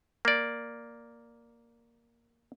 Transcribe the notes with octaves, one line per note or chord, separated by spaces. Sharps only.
A#3 D5